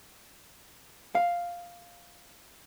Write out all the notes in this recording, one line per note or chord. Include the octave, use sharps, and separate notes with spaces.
F5